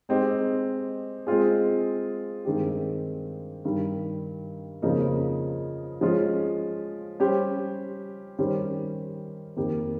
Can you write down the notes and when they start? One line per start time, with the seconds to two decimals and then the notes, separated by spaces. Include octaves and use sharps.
0.09 G#3 C4 D#4 G4
1.27 G#3 C4 F4 G#4
2.45 G2 D#3 G#3 C4 G4
3.65 G2 D#3 G3
4.82 F2 C#3 F3 A#3 D#4
6.01 F3 G#3 C#4 F4
7.20 G3 C#4 G4 C5
8.39 D#3 G3 C#4 G4 C5
9.56 F2 D#3 A#3 D#4 G4